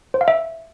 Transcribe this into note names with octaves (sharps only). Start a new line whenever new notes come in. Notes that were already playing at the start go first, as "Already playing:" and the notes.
C5
F5
E5